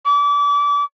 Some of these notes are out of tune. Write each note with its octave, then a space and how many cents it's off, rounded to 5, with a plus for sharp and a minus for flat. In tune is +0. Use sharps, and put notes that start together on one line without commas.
D6 -30